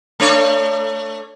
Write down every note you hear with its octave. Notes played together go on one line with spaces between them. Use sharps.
A3 D4 C#5